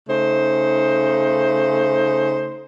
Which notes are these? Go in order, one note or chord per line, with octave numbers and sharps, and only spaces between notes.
C#3 A3 D#4 C5